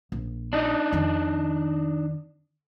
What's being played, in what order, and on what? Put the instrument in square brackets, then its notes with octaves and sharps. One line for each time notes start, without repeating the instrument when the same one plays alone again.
[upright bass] A#1
[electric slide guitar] D4 D#4 D#5
[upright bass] F2 D#3